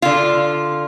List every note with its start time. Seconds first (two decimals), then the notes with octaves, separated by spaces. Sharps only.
0.02 D3 F4